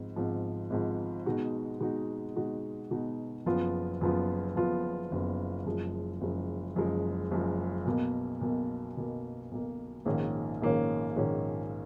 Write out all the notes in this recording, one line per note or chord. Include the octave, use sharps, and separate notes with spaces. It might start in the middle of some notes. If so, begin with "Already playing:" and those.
Already playing: G#1 G#2 F3
G#1 G#2 F3
G#1 G#2 F3
B2 G#3 D#4 F#4
B2 G#3 D#4 F#4
B2 G#3 D#4 F#4
B2 G#3 D#4 F#4
F#1 F#2 F3 B3 F4
F#1 F#2 F3 B3 F4
F#1 F#2 F3 B3 F4
F#1 F#2 F3 B3 F4
F#1 F#2 F3 G#3
F#1 F#2 F3 G#3
F#1 F#2 F3 G#3
F#1 F#2 F3 G#3
B1 B2 A#3
B1 B2 A#3
B1 B2 A#3
B1 B2 A#3
A#1 G#2 D#3 A#3 C#4
A#1 G#2 D#3 A#3 C#4
A#1 G#2 D#3 A#3 C#4